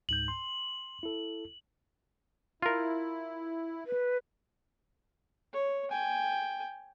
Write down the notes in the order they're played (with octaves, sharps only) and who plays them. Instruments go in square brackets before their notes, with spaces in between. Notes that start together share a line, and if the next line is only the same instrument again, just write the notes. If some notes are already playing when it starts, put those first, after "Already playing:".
[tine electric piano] C#2 G#2 G6 [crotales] F#7
[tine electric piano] C6
E4 A4
[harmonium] E4 [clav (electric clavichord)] F4 A#4
[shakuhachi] B4
[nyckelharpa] C#5
G5 G#5